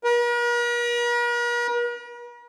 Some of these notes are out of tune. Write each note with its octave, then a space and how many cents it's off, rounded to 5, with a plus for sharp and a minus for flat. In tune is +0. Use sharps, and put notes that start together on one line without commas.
A#4 +45